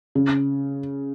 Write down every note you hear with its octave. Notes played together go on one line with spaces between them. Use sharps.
C#3